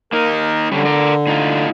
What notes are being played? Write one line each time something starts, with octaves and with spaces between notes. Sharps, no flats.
A#3 D#4 A#4
D3 G3 C#4 D4
A#4 D5
A2 D#4 F4